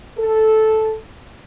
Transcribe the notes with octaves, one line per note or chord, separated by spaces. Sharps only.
A4